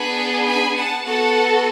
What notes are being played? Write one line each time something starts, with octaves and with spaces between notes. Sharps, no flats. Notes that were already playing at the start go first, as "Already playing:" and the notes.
Already playing: B3 D4 G#4 G#5 B5
G#5 B5
F#5 A5
B3 F#4 A4 F#5 A5